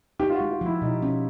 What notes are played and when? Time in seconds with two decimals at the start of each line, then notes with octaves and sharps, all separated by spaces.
0.19 D#4 G4
0.30 F4
0.35 F#4
0.41 G#3
0.50 F4
0.61 F3 E4
0.82 B2 D#4
1.03 C#4